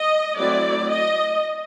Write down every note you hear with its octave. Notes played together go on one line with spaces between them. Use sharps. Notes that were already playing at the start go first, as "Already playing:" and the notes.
Already playing: D#5
F#3 A3 C4 E4 D5
D#5